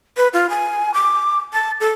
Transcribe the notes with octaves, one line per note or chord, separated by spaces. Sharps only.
B4
F4
G#5
D6
A5
A4